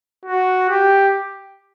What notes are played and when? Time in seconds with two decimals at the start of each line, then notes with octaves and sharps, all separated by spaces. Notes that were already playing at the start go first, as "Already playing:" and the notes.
0.25 F#4
0.69 G4